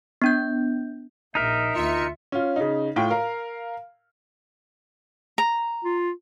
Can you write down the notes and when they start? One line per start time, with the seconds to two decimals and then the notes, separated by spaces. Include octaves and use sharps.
0.22 B3 D4 G6
1.35 A#1 D#4 A#4 E5
1.75 D2 F4 E5 C#7
2.32 C#4 F4
2.56 C#3 D#4
2.96 A2 F4 G5
3.10 A#4 F5
5.38 A#5
5.84 F4